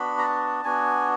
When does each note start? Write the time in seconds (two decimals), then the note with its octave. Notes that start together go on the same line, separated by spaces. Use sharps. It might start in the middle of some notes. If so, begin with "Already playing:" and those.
Already playing: B3 D4 F#4 B5
0.18 A#5
0.23 A5
0.64 B3 D4 F#4 G#5